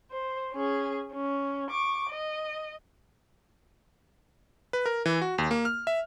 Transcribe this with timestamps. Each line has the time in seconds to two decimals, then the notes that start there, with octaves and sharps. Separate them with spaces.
0.11 C5
0.53 C#4 G#4
1.13 C#4
1.70 C#6 D6
2.10 D#5
4.73 B4
4.86 A#4
5.06 E3
5.21 F#4
5.38 D#2
5.51 A#3
5.65 F6
5.87 E5